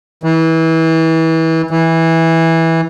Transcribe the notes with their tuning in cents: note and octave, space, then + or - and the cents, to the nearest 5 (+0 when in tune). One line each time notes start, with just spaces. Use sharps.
E3 -25
E3 -10